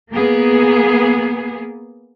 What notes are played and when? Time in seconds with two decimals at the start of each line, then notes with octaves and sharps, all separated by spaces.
0.12 A#3 B3 G#4